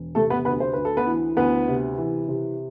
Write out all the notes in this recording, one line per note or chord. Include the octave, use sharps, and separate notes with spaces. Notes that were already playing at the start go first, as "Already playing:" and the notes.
Already playing: E1
C3 A3 A4
B3 B4
D2 B3 B4
C5
D2 B4
A4
B3 B4
E3
D2 B3 B4
C3
E3
C3